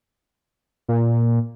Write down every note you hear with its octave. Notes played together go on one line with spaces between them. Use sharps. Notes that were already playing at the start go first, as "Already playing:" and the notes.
A#2